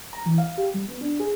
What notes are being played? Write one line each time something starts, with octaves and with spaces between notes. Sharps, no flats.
A#5
E3
F5
G4
G3
B3
D4
G#4